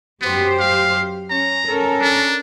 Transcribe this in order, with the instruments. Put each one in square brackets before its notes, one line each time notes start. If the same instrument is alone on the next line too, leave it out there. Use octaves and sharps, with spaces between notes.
[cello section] F#2 G4 C5 [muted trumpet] B3
[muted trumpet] F5
[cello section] C#4 [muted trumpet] A#5
[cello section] C#4 A4 A#4
[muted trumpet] D4